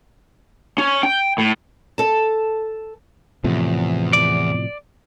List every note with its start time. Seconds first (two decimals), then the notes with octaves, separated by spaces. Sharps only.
0.78 C#4
1.03 G5
1.38 A2
1.98 A4 A5
3.44 E2 A2 C3 F3
4.13 D5